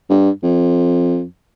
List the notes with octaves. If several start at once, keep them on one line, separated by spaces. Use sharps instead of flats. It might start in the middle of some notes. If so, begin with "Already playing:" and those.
G2
F2